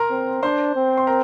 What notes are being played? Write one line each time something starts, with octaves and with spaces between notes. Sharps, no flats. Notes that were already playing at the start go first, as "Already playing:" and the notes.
Already playing: A#4 A#5 C6
C4
D4 C5 C6
C4
C6
A#4 A#5